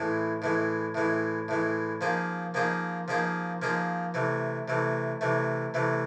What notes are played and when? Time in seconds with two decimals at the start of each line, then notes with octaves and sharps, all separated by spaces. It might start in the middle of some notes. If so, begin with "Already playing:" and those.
Already playing: A2 E3 G#3
0.42 A2 E3 G#3
0.95 A2 E3 G#3
1.48 A2 E3 G#3
2.01 F3 A#3 D#4 G#4 C5
2.54 F3 A#3 D#4 G#4 C5
3.08 F3 A#3 D#4 G#4 C5
3.62 F3 A#3 D#4 G#4 C5
4.14 C3 E3 A3
4.68 C3 E3 A3
5.21 C3 E3 A3
5.74 C3 E3 A3